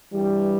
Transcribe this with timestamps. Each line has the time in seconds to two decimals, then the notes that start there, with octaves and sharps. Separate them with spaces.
0.13 G2 E3 G3